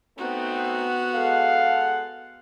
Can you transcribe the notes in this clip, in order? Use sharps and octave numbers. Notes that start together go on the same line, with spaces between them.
A3 B3 C4 D#4 F#4
G#3 A4 F5 F#5